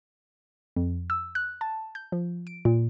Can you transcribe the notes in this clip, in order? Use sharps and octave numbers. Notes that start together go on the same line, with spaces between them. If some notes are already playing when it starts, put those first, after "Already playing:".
F2
E6
F#6
A5
G6
F3
D7
A#2